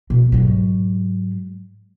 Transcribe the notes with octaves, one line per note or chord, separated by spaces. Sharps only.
B2
G#2 F#3